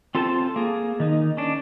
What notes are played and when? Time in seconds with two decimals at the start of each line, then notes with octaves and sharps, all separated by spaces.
0.15 C4 F4 A4 C5 A5
0.56 A#3 G#4
1.00 D#3 D#4
1.37 C#4 D4